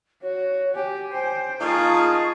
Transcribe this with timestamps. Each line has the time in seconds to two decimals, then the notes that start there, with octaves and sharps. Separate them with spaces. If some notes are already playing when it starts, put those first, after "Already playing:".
0.22 F#4 C#5
0.75 G4 G#5
1.12 C5 G5
1.61 A#3 D#4 F4 G#4 A5 C#6